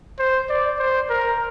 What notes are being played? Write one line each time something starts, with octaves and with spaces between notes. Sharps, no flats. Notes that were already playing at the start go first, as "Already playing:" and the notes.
C5
D5
C5
A#4